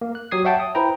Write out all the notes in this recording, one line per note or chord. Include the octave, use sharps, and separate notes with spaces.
A#3
F#6
F#3 G4 D#6 G#6 C7
C#5 E5 F#5 G5 A5
D#6
E4 B4 C5 G5 A#5